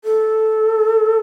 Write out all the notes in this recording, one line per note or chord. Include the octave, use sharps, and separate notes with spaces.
A4